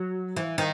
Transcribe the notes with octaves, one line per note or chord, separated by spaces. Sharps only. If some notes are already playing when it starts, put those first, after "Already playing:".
Already playing: F#3
E3
D#3